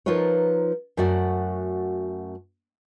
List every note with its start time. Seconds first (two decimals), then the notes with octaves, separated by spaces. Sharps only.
0.06 F3 D#4 F4 A#4 B4 C#5
0.97 F#2 A3 F#4 D5 F#5